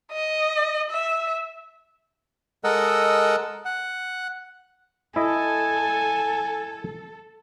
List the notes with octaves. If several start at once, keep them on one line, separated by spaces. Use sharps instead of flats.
D#5
E5
G#3 A4 A#4 D#5 F#5 E6
F#5
E4 A4 D#5 G#5